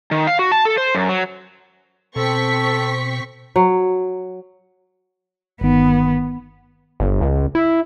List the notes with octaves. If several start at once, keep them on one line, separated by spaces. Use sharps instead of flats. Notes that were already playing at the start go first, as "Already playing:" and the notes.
D#3
F5
F#4
A5
A4
C5
F#2
F#3
B2 C4 A4 C#6 B6
F#3
G1 D#3 B3
G1
C#2
E4